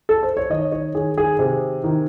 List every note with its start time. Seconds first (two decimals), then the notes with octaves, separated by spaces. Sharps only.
0.09 A4
0.23 C5
0.37 C#5
0.50 D#3 D#5
0.72 C#5
0.95 D#3 G#4
1.18 G#4
1.39 C3 G#4
1.84 D#3